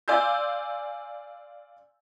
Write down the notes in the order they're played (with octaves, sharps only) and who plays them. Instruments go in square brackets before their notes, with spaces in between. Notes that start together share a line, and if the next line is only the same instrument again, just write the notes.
[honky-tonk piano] D5 F5 G#5 C6 E6 G6